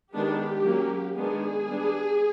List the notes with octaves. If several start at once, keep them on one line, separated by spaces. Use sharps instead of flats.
D#3 G#3 B3 D4 G4
F#3 A#3 C#4
D#3 G#3 B3 D4 G#4
G3 B3 D4